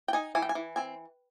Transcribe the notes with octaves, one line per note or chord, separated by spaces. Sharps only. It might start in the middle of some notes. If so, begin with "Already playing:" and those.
G5
D#4 G#5
E3 G#5
G5
G#5
E3
C4 G#5